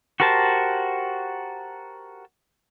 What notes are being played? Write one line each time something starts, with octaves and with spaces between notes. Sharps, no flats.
F#4 G4 A#4 C5 A5